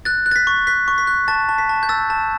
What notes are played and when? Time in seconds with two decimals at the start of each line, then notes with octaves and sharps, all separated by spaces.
0.05 F#6 A6
0.26 F#6
0.31 A6
0.36 B6
0.47 C#6
0.67 F#6 B6
0.88 C#6
0.98 B6
1.07 F#6
1.28 A5 A6
1.49 A5
1.58 B6
1.69 A5
1.83 G6
1.89 E6 A6
2.10 A5